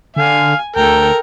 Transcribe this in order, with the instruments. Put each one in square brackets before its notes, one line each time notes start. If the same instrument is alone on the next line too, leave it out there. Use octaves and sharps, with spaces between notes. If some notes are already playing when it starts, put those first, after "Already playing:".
[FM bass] D3 [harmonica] F5 [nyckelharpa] G#5
[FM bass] D2 [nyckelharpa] A4 G5 [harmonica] A#4